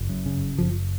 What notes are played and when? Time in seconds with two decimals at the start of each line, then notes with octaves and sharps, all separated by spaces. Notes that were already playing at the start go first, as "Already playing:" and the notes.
Already playing: F#1
0.09 F#2
0.26 C#3
0.42 F#1
0.58 F#1 F3